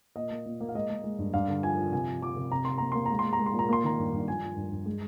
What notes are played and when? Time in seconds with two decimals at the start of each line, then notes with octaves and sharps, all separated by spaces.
0.16 A#2 D#5
0.31 A#3
0.46 A#2
0.60 A#3
0.69 F5
0.75 G#3 D#5
0.90 G#3
1.04 G#3
1.19 G2
1.34 G2 F5
1.48 D3
1.63 F3 G#5
1.77 F3
1.92 C3 G#5
2.07 F3
2.22 F3 D6
2.36 C3
2.51 C3 A#5
2.65 C3 C6
2.78 A#3 A#5
2.92 A#3 C6
3.06 G#3 A#5
3.19 C6
3.25 G#3
3.33 A#5
3.39 G#3
3.46 C6
3.54 A#2
3.59 A#5
3.69 A#3 C6
3.84 D#3 A#5
3.99 G2
4.13 G2
4.27 F3 G#5
4.42 F3
4.56 G2
4.72 G2
4.86 G#3